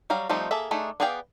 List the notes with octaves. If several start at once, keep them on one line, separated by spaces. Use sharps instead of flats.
F#3 G3 F5 A#5
F3 G3 A3 C4 D#4
A#3 G#4 A4 E5
A3 D4 D#4 G#4
B3 G#4 D5 F5 G5